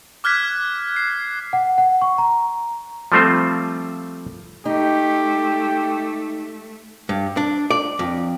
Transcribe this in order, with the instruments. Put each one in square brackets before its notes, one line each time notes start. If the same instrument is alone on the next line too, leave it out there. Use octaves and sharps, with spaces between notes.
[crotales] D6 F6 F#6 G#6 B6
C7
[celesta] F#5
F#5
C#6
A#5
[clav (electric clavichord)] F3 G3 A3 C4 F4 C5
[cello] A3 [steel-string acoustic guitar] D#4 [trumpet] G4
[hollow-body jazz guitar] G2
D4
D5
F2